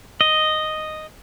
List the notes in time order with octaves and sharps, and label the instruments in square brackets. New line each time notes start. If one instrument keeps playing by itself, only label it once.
[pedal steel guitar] D#5